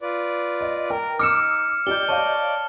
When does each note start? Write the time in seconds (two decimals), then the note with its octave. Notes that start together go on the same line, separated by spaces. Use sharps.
0.01 F4 B4 D5
0.61 D#5
0.90 A#4 G5
1.19 D#4 D6 E6 F6 C#7 E7
1.87 G4 D5 D#5 G6 G7
2.09 C#5 D#5 F5 A5